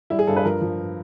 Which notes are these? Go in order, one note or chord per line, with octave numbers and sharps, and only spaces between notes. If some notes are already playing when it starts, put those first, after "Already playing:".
G3 E4
G#4
G2 A4
B4
F3 A#4
F3